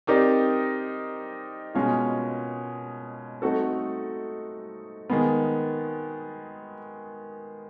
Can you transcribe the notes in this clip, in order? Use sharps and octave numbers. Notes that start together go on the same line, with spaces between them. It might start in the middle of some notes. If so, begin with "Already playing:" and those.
C4 D#4 G4 A#4 D5
B2 G#3 C#4 F4
A3 C4 D#4 F#4 A4
D#3 G#3 B3